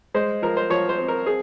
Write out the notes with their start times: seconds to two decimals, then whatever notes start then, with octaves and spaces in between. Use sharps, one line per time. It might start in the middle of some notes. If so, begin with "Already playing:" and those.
0.14 G#3 C5
0.42 F3 A#4
0.57 C5
0.70 F3 C#5
0.89 C5
0.98 C4
1.08 A#4
1.26 C4 G#4